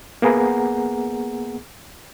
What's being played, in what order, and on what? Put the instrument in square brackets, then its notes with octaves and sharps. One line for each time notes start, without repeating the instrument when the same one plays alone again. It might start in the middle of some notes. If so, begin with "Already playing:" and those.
[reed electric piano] A#3 B3 G#4 F#5 A#5